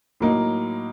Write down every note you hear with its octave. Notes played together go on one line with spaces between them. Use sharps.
A2 F#3 A#3 D#4